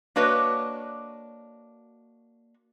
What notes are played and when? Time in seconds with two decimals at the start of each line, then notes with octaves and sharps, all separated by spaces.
0.16 A#3 D4 F#4 B4 C#5 D#5